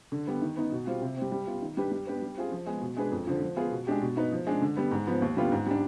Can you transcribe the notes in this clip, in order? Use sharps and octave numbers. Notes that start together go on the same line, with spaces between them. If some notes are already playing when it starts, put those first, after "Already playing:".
D3
G3 B3
D#3
B3 D#4
B2
G3 C4 F4
C3
C4
G3
G3
B3 F4
D#3
G3 D4 G4 B4
G3
B3 D4 G4 B4
G3
C4 F4 G#4
F3
G#3 B3
B2
G#3 D4 G#4 B4
F2
D3 F3
F3
B3 F4 G#4
B2
G#3 D4 G4
B2
B3 D#4 B4
F3
G#3 D4
D3
G3 B3
G#2
F3 B3
D#2
D3 G3 B3 F4
G#2
G3 D4